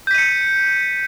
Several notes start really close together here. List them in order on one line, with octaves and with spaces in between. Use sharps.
G6 B6 D#7 C#7